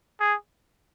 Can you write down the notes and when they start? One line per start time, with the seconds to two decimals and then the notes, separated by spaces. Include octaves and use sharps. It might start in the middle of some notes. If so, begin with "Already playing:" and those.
0.20 G#4